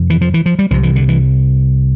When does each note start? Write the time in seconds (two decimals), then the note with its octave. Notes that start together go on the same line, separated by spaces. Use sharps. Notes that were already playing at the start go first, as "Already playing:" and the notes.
Already playing: F2 C3
0.10 E3
0.21 F3
0.34 E3
0.46 F3
0.59 G3
0.71 C2 C3 F3
0.83 E3
0.95 D3
1.08 E3